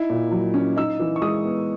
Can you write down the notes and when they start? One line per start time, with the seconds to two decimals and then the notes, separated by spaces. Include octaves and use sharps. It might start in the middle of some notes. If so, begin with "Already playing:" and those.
Already playing: D#4 E4
0.10 A#2
0.31 F#3
0.54 C#4
0.77 D#4 E6
0.99 E3
1.16 C#6
1.22 G#3 D#6
1.44 B3